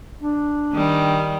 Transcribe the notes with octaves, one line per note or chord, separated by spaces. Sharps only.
D4
D#3 G3